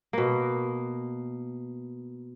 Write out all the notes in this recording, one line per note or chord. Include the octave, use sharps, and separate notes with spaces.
B2 A#3